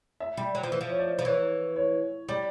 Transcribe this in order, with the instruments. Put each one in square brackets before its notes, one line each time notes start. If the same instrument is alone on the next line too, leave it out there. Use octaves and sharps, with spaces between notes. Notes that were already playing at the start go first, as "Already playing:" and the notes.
[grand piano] E5
[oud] G3
F#3
F3
E3
F3
[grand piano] C#5
D5
[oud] F3
[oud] E3 [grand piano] C#5
[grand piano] C#5
[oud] G3 [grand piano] D5